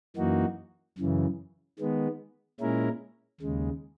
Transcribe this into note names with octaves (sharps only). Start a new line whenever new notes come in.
F#2 E3 A#3 D#4 F#4
F#2 C#3 E3
D#3 G#3 B3
A#2 G#3 C#4 E4 A#4
D#2 C#3 G#3